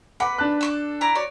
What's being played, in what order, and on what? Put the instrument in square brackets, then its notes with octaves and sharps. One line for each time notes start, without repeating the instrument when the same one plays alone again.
[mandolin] B4 [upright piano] F#5 D6
[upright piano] D4 A5 F#6
[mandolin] A4 C6 D6
E4 D5 A#5
F#4 C#5 D5